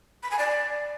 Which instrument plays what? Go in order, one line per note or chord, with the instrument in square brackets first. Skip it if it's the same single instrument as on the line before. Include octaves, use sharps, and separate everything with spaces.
[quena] B5
G#5
D5